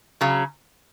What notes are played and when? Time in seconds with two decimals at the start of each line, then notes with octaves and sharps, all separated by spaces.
0.21 C#3 F#3